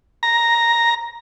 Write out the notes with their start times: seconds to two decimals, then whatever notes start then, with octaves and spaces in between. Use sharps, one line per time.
0.23 A#5